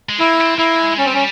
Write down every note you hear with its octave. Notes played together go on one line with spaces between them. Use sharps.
G#3
A#3 E4
C4
A#3 E4
G#3
G3 C#4
C4
C#4